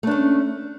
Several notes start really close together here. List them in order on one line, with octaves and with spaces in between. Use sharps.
A3 D4 C#4